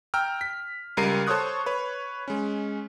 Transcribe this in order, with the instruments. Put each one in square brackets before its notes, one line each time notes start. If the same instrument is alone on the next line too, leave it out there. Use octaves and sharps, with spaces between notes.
[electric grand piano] G5 A#5 E6 F6
B6
C#2 G3 A#4 C7 D#7
A4 C5 C#5 C#6 D#6 F#6
B4 C#5
G#3 C#4